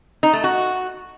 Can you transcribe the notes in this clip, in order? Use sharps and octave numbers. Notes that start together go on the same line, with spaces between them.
D#4
A3
F#4